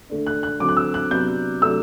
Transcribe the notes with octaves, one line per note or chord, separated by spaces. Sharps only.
D3 A3 D4
F#6
F#6
D3 F#3 C4 D6
F#6
E6
F#6
C3 F#3 B3 D4 G6
C3 F#3 A3 D4 E6